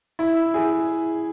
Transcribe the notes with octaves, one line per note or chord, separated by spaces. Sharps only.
E4
G#4